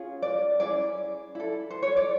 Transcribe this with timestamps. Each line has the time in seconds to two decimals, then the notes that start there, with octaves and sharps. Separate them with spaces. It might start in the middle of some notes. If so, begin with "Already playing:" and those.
Already playing: C#4 F4 G#4
0.22 D5
0.60 C#4 E4 G#4 D5
1.35 E4 A4
1.71 C5
1.83 C#5
1.97 D5